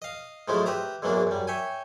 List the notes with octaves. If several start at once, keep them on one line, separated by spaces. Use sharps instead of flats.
D#5 F5
G#2 F3 F#3 G#3 A3 E4
G4 B4 E5 A#5
E2 G#2 E3 F#3 A#3 D4
F#2 G3
C#5 E5 G5 G#5